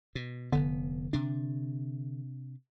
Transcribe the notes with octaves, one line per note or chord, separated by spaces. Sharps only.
B2
F1 D3 B3
C3 D4